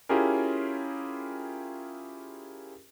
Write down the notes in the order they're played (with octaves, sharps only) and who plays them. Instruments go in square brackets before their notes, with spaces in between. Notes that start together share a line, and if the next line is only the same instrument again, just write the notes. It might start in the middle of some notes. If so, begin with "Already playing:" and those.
[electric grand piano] C#4 E4 F4 G4 G#4 A#4